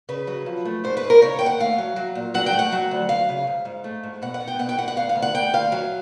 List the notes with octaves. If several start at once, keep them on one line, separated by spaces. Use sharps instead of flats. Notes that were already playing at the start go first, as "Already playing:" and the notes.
C#3 B4
F#3
F3
A3
G#2 C5
B4
G#2
A#4
C#3 C#5
D#2 G5
F#5
A3 F5
F#3
F#3
A#2
F#3 F#5
G5
A3
F#5
F#3
D2
F#3 F5
C#3
G#2
G#2
A3
G#2
B2 F#5
F#5
B3
G5
B2 F#5
G5
B2 F#5
F#5
D2 F5
F5
D2
F#5
D2 G5
D2 F5
F#3